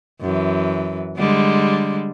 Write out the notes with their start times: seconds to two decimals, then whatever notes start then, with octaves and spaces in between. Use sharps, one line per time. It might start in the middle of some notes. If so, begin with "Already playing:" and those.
0.21 F#2 E3
1.17 D3 G3 G#3